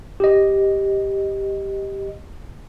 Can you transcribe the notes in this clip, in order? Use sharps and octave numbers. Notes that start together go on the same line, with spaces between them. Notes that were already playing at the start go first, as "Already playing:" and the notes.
G4 D#5